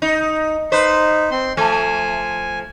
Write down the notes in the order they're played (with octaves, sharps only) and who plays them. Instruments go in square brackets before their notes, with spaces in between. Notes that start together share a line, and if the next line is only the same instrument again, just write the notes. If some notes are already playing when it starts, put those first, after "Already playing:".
[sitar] D#4
[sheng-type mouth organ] D#4 [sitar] B4 C5
[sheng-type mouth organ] C4 C6
[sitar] F3 A3 [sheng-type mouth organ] G#5